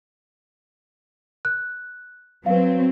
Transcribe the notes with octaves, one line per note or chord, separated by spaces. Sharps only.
F#6
F#3 C4 B4 F5